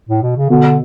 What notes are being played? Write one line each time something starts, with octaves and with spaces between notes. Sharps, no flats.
A2
B2
C#3
B2 D3